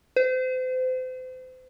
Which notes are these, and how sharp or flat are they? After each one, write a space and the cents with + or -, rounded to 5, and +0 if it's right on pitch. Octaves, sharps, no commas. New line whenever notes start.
C5 -35